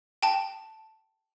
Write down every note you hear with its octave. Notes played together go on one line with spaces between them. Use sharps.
G5 A5